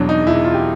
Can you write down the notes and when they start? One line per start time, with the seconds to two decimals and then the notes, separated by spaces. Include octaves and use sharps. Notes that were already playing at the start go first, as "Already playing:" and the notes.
Already playing: E2 B2 F#3 D4
0.09 D#4
0.26 E1 E4
0.44 F4
0.54 G4